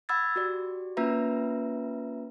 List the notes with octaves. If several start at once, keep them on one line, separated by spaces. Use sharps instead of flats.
F#5 B5 E6 G#6 A6
F#4 G4 D5
A#3 C#4 F4 B4 E5 A#5